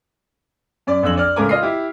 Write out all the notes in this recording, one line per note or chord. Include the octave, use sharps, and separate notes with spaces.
F#2 D5
A#1 F2 E6 F#7
D5 F6
C#2 A2 G#3 A#4 G#5 D6
F4 D#5 F6 C7
E4 G4